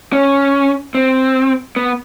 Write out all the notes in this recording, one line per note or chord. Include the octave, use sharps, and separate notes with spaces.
C#4
C4
B3